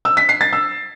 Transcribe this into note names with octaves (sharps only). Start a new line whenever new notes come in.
E6
B6
C7
A6
E6